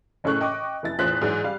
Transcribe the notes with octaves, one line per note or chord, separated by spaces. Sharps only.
F#1 A2 C#3 A3 C#6 F#6
D#5 G5 C#6 D6
F1 E4 A6
E2 A2 F4 C5 F#6 B6
G#2 E3 F#3 D5
G3 F5